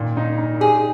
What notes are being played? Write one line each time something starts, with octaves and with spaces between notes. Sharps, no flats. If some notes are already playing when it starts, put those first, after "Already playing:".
Already playing: A#2 D#3
D#4
D#4
G4 G#4